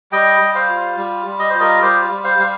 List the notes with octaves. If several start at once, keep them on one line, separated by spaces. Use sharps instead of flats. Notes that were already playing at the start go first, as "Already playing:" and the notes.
G3 D#5 G5
G3
C5 F5
F4
G3
G3
D#5
F4 C5
A#4 D#5
G3 G4 C5
G3
C5 F5
G3 F5